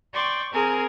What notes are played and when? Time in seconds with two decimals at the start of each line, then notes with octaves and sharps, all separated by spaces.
0.13 D5 G5 C6 C#6
0.52 C4 G#4 A#4 G#5